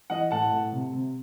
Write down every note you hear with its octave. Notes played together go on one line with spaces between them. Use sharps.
E3 D#5 F#5
A2 F#5 A5
A2
C3
C3